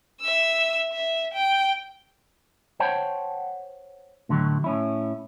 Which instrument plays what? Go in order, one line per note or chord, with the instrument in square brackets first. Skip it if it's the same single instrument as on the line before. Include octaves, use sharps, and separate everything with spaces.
[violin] E5 E6
E5
G5
[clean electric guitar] C5 C#5 F#5 G5 A5
A2 D3 D#3 F#3
A2 C#4 E4